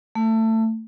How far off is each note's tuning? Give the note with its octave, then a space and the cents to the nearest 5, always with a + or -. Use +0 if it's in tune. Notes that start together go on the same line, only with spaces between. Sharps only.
A3 +20